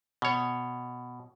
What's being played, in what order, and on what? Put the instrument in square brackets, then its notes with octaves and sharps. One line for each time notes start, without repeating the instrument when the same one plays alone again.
[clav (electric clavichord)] B2 C#5